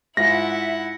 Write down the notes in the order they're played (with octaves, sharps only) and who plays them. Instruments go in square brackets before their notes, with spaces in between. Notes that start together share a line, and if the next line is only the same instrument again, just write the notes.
[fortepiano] G#2 F4 [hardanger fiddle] E4 F#5 [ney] E5 [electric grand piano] A#6